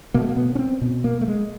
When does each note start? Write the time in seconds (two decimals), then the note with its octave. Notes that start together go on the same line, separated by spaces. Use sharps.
0.14 B2 A#3
0.22 A3
0.29 A#3
0.37 B3
0.55 C#4
0.59 C4
0.81 B2
1.04 A#3
1.21 A3
1.28 G#3